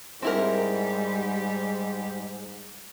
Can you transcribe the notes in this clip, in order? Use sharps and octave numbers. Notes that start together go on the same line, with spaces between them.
G#2 G3 C4 E4 G4 A#4